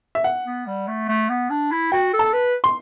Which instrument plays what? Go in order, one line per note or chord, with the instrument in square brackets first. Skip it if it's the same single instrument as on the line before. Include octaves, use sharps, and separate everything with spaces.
[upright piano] E5
F#5
[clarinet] B3
G3
A3
A3
B3
D4
E4
[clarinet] F#4 [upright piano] G5
[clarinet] A4
[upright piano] A5
[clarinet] B4
[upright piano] C6